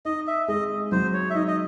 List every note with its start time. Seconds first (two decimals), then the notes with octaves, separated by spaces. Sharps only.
0.05 D#4 D#5
0.27 E5
0.48 G#3 D#5
0.92 F#3 C5
1.14 C#5
1.30 E5
1.35 D#4 D#5
1.48 D#5